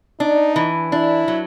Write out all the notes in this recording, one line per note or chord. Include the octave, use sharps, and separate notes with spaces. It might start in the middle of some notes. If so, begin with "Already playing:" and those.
D4 D#4
E3
D4 E4
F#3